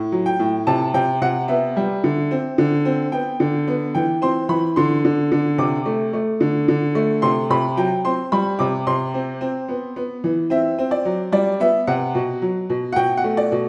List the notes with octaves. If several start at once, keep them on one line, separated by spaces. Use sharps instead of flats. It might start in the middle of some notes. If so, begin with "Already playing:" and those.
Already playing: A2
F#3
G5
A2
C3 A5
C3 G5
C3 F#5
B3 E5
G3
D3
C4
D3
C4
B3 G5
D3
B3
E3 G5
C4 C6
E3 B5
D3 C6
D3
D3
C3 D6
A3
A3
D3
D3
A3
C3 C6
C3 B5
F#3 G5
C4 C6
G3 B5
C3 D6
C3 C6
C4
C4
B3
B3
E3
C4 E5
C4
D5
F#3
G3 D5
B3 E5
C3 F#5
B2
F#3
B2
F#5
B2 G5
F#5
A3
D5
B2